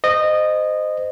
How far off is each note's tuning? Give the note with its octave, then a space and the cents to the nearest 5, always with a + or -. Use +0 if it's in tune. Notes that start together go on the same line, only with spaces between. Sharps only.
C5 -20 D#5 -15